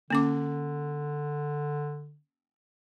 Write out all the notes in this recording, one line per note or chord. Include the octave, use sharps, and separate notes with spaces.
D3 A#3 C#4 D6